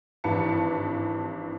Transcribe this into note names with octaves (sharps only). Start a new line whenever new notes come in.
G#1 G2 E3 B4 A5 C#7